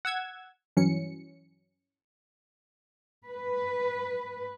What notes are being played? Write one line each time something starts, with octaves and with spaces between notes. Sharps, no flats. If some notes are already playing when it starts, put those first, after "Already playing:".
F#5 E6 G#6
G2 E3 F#3 C#4 C#7
B4